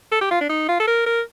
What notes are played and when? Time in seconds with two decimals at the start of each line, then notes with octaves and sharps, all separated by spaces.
0.12 A4
0.21 G4
0.31 F4
0.41 D4
0.50 D#4
0.69 F4
0.80 A4
0.88 A#4
1.06 A#4